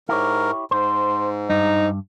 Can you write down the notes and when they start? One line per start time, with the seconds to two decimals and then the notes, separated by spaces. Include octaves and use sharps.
0.09 G#2 E4 G4 A#4 C#5
0.71 G#2 C5
1.50 G2 D#4